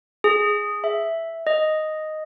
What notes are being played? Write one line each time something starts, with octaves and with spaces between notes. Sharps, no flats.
G#4
E5
D#5